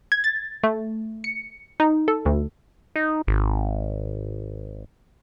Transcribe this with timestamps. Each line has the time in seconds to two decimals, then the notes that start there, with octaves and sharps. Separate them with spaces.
0.12 G#6
0.24 A6
0.63 A3
1.24 C#7
1.80 D#4
2.08 A4
2.25 D2
2.96 D#4
3.27 G#1